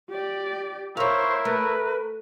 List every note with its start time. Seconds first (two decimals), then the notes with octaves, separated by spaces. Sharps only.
0.10 G4 D5
0.97 E4 A#4 C5 C#5 F5 C#6
1.45 A3 B4